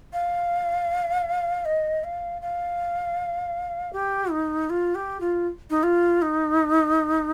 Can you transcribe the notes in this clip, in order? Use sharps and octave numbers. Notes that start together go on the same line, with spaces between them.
F5
D#5
F5
F5
G4
D#4
F4
G4
F4
D#4
F4
D#4